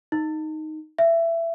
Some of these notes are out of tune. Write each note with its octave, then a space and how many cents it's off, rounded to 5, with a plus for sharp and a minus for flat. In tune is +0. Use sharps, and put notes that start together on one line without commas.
D#4 +0
E5 +20